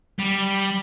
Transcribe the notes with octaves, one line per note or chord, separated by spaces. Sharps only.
G3